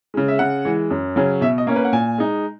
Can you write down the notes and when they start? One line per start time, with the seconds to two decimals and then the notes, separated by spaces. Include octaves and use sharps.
0.14 C#3 G#3
0.28 E5
0.39 C#3 F#5
0.65 E3 G#3
0.90 F#2
1.16 C#3 F#3 C#4
1.41 B2 E5
1.58 D#5
1.67 A#3 C#4
1.76 B4
1.85 F#5
1.93 A#2 G#5
2.18 G#3 D#4